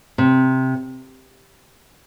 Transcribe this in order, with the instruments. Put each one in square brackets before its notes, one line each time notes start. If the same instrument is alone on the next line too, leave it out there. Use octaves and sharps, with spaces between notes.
[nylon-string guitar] C3